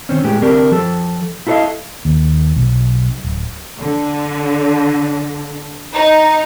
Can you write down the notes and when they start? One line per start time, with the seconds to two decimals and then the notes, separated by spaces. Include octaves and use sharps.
0.09 D#3 C4 C#4
0.24 A2 G#3 B3 G4
0.42 D3 C4 D4 G4 A#4
0.72 F3 A4
1.47 E4 F4 A4 C5 D#5 F5
2.05 D#2
2.56 B1
3.24 D1
3.79 D3
5.94 D#4